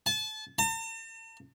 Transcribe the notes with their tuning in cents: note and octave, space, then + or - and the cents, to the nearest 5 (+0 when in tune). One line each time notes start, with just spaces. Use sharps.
A5 -30
A5 +45